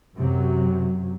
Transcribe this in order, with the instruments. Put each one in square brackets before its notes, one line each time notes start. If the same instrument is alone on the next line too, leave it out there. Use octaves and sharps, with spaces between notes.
[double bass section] F#2 C3 F#3